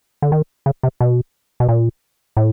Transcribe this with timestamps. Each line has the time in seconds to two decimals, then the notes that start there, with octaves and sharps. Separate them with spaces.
0.22 D3
0.32 D#3
0.66 C#3
0.83 C3
1.01 B2
1.60 B2
1.69 A#2
2.37 A2